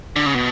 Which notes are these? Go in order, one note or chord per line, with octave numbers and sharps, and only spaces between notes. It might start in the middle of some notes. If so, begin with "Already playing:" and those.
D3
C#3
B2